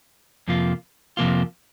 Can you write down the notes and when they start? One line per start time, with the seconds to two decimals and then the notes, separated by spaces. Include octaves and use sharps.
0.48 F2 C3 F3 A#3 F4
1.17 F2 C3 F3 A#3 F4